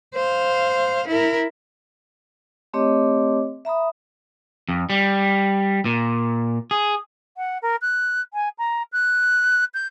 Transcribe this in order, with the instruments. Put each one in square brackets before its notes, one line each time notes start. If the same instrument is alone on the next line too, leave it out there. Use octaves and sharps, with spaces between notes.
[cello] C5 F5
E4 A#4
[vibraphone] A3 C4 G4 C#5 D#5 D6
E5 A#5 B5 D#6
[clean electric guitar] F2
G3
A#2
G#4
[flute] F#5
A#4
F#6
G#5
A#5
F#6
G6